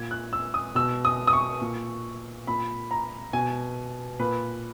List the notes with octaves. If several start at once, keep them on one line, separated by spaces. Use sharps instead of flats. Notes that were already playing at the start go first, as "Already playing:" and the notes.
Already playing: A#2 G#6
F#6
E6
D#6
B2 E6
D#6
D#6
C#6
A#2
A#2 B5
A#5
B2 G#5
A#2 B4